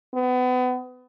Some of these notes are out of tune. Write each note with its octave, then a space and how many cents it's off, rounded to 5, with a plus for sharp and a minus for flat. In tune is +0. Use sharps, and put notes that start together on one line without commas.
B3 +30